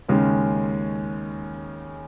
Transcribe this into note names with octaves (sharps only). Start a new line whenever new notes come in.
D#2 C#3 G#3 C#4